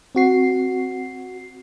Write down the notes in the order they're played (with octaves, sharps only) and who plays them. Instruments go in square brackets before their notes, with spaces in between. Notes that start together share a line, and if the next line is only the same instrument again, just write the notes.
[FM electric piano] C4 F#4 C7